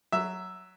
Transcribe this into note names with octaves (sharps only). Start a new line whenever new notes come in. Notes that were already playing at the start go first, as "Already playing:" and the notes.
F#3 E5